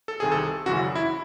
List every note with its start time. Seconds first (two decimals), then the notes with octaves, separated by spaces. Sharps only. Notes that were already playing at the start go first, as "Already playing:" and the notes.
0.08 A4
0.20 C2 C3 D#3 G#4
0.32 A4
0.66 G#1 F#2 C#3 E3 F#4
0.95 E4